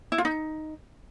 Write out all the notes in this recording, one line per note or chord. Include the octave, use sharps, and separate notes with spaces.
E4
F4
D#4